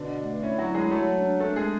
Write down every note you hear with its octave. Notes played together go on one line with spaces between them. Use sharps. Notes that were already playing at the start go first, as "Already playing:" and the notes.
Already playing: B2 D3 D4
A3
C#4 E4
F#3 F#4
E4
G#3 G#4
F#3 A3 A4
D4
A3 D4 A4
G#3 G#4